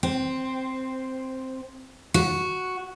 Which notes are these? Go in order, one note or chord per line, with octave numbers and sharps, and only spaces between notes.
C4
F#4